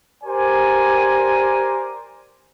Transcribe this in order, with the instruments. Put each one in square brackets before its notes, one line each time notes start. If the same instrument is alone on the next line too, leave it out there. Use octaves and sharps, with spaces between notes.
[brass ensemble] G4 A#4 C5 D5 G#5